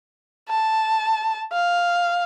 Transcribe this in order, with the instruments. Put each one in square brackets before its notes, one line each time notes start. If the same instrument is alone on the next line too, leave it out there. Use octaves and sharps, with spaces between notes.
[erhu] A5
F5